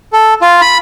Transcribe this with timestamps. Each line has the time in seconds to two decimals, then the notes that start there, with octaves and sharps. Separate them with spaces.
0.13 A4
0.41 F4
0.61 B5